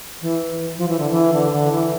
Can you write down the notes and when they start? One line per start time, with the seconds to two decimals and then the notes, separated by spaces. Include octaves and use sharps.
0.22 E3
0.77 F3
0.88 E3
0.99 D3
1.11 E3
1.33 D3
1.52 D3
1.72 E3